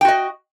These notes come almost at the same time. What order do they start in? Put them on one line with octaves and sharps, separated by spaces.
G5 F#4 D#5